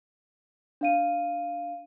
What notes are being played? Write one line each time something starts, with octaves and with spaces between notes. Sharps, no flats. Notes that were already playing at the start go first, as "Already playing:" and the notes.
D4 F5 D#7